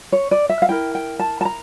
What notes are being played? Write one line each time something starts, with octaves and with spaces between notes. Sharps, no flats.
C#5
D5
E5
F5
E4 A#4 G5
G5
A5
A5
A#5